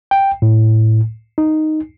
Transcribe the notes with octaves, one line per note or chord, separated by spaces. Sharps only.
G5
A2
D#4